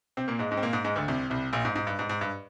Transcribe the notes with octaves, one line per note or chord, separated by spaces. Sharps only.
C3 C4
A#2 A#3
G#2 G#3
G#2 G#3
C4
A#2 A#3
G#2 G#3
G#2 G#3
D2 D3
C2 C3
C2 C3
A#1 A#2
G#2
G#2
G2
G#2
G#2
G2